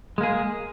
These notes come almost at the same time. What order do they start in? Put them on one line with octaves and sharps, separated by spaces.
G#3 A#3 G#4